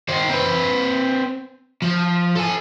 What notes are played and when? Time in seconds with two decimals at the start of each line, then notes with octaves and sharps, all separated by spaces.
0.09 D#3 C5
0.30 C4 B4
1.82 F3
2.35 A4 G#5